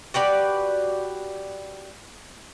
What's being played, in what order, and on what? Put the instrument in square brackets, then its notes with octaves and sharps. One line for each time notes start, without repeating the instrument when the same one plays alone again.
[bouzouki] F#4 G4 B4 D5